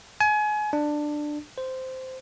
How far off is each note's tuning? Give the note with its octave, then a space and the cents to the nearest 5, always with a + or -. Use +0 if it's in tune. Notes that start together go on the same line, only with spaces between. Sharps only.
G#5 +30
D4 +15
C5 -10